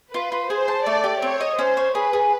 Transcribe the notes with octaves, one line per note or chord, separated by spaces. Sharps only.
F4 B4
F4
G#4 C5
A5
A3 D5
G4
C4 C#5
D#5
C#4 C5
C#5
G#4 B4
G#4